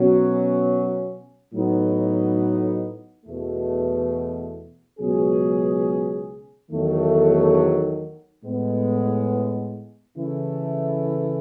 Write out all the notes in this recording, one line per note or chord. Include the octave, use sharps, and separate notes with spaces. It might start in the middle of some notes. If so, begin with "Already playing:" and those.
Already playing: B2 F#3 C#4
A2 F#3 B3 D#4
E2 B2 A3
C#2 B2 F#3 C#4 G#4
E2 D#3 F#3 A3
A2 G#3 B3
C#3 E3 A3 E4